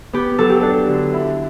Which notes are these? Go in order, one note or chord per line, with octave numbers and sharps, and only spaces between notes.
B3 G4
F#3 A4
G4
D4 A4
D3
E4